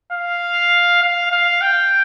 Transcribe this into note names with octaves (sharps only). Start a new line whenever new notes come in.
F5
F5
F5
G5